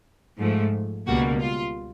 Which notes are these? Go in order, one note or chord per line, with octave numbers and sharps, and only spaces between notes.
G#2 F3 A3
C#2 B2 G3 A#3 F#4
F4